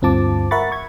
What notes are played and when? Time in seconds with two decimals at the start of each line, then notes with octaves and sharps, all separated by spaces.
0.02 D2 G2 C4 F4 A5 D6
0.51 A#4 E5 F#5 B5 C#6 A6
0.72 C#6 G#6